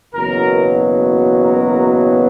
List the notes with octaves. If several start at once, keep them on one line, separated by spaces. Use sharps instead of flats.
F#1 E2 B2 F#3 A#4
A#4